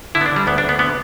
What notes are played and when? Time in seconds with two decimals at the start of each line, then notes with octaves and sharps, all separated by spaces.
0.15 D3 E4
0.21 B3
0.26 D4
0.31 D3
0.36 G3
0.47 D2 B3
0.58 D4
0.64 D2 B3
0.79 D3 B3